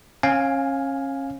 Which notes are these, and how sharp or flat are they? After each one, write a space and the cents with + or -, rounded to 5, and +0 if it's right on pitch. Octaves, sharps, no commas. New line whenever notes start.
C#4 -30 F5 +10 G#5 +0